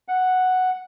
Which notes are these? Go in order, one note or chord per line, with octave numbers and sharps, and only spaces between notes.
F#5